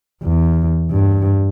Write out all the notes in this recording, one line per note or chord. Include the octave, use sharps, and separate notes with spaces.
E2
G2